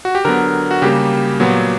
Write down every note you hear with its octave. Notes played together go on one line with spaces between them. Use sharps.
F#4
G4
D3 F#3 B3 A#4
F#4
C#3 G3 A#3 G4
A#2 F#3 B3